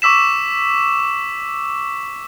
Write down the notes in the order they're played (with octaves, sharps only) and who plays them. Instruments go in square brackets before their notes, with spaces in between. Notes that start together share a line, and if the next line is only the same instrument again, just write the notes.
[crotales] C#6 D6 E6 B6 E7